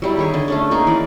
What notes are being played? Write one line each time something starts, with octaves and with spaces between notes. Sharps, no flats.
F#3 G3 E4
D#3 G#4 C#5
D3
A3 C#4 D4
A#3 D#4 G#4
E3 D5